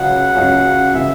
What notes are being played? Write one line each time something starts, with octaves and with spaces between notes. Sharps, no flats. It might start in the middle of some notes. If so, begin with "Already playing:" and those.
Already playing: C#2 C#3 F#3 C#4 F#4 F#5
C#2 C#3 F#3 C#4 F#4
C#3 E3 E5